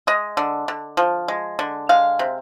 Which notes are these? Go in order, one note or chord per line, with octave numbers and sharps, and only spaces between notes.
G#3 D#5
D3
D3
F3
G#3
D3
G#3 F5
C3